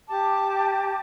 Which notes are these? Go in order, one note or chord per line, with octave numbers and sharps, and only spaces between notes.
G4 A5 D6